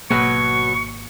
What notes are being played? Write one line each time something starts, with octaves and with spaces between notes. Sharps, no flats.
G#1 B2 F#3 A#3 C#6